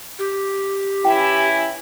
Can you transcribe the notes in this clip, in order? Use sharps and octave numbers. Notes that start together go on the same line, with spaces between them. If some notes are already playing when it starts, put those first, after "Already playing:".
G4
E3 C#4 E4 G5